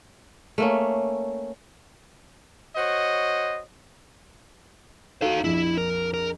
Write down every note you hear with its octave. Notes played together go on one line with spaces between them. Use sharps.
A3 A#3 C#4
F#4 C5 C#5 D#5
D#4 F#4 A4 F5
A#1 F2 E4
A#4
A#4